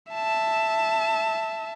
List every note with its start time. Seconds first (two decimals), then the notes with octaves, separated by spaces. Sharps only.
0.12 E5 A5